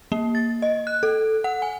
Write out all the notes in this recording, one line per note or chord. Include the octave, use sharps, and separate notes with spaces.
A#3
A6
D#5
F#6
A4
F#5
G#5